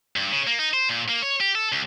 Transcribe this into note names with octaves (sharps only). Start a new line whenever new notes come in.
G2
C#3
A#3
D#4
C5
A#2
A#3
C#5
G4
A4
C#2